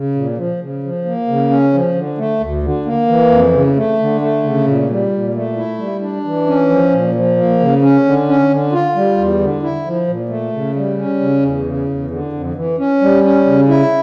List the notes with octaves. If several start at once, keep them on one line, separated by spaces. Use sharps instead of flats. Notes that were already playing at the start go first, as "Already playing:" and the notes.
Already playing: C#3
A#2
F3
C#3
F3
A#3
C#3
C#4
F3
D3
A3
D2
D3
A#3
E3
F2
C#3
A3
D3
A3
C#3
A#2
G3
A#2
A3
E4
G3
D4
E3
C#4
F3
A#2
F3
A#3
C#3
C#4
D3
C#4
D3
F4
G3
E2
D3
E4
F3
A#2
A3
C#3
G3
C#4
C#3
E2
C#3
E2
D3
F2
E3
C#4
G3
C#4
C#3
E4